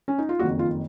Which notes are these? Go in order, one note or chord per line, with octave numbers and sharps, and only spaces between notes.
C#4
D#4
F4
F#1 F2 D#3 F#4
F4